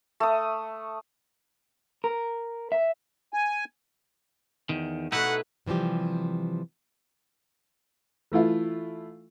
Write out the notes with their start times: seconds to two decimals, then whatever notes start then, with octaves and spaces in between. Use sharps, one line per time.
0.20 A3 D#6
2.04 A#4
2.72 E5
3.33 G#5
4.69 E2 D#3
5.12 B2 A3 D#4 E4 B4 F#5
5.66 C3 E3 F3 G3 G4
8.32 E3 A3 E4 F4